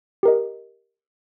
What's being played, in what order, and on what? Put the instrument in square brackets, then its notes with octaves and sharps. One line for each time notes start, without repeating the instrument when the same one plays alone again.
[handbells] G4 A#4 D#5